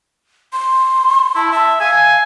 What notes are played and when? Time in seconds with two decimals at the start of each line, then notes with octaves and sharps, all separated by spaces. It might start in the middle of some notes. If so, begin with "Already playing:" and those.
0.53 C6
1.36 E4 A5
1.52 E5 A5
1.81 F5 G#5